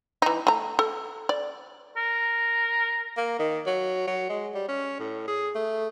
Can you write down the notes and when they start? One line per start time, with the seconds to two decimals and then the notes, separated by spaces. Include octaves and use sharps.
0.22 E3 D#4
0.47 A3 A#5
0.79 A4
1.29 D5
1.97 A#4
3.17 A#3
3.39 D#3
3.66 F#3
4.07 F#3
4.29 G#3
4.55 G3
4.68 C#4
4.99 A2
5.28 G#4
5.55 A3